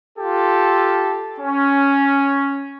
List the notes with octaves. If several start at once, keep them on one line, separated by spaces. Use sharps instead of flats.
F4 G4 A4
C#4